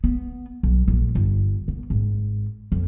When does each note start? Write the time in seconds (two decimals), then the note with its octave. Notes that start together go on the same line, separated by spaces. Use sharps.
0.04 B3
0.63 B1
0.88 A#1
1.15 G1
1.68 B2
1.90 G#1
2.72 F2